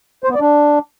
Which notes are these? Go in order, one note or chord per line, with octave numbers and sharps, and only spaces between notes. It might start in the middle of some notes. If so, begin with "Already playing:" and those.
C5
B3
D5
D4